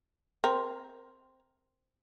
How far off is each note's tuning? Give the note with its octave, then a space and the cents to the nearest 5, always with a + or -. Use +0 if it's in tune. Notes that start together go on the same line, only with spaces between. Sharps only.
C4 +0 A#4 +15